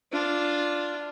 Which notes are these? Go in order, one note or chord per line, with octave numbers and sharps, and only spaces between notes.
D4 F4